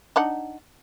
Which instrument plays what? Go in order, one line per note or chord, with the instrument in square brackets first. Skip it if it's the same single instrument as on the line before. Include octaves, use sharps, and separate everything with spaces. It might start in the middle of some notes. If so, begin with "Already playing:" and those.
[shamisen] D4 D#4 F#5